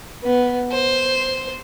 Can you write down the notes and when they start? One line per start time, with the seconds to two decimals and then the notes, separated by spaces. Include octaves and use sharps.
0.24 B3
0.72 C5